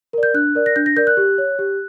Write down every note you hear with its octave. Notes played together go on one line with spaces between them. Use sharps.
A#4 D5
G6
D4 F#6
A#4 D5
A#6
D4 G6
A#6
A#4 D5 G6
F#6
G4
C#5
G4